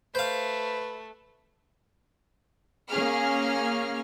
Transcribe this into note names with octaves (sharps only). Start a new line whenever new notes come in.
A3 B4 C5 F5
A#3 C#4 G#4 F6